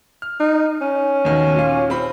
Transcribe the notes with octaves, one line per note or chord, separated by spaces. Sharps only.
F6
D#4
C#4
D#2 B2 D#3
A#2 F5
C4 B5